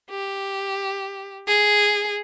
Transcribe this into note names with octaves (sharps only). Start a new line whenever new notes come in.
G4
G#4